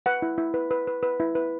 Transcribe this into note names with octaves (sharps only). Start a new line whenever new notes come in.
B4 F#5
E4
E4
B4
B4
B4
B4
E4
B4